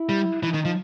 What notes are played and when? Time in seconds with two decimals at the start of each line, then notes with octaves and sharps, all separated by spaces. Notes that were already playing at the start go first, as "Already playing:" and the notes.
Already playing: E4
0.09 G3
0.42 E3 D#4
0.54 D#3
0.65 F3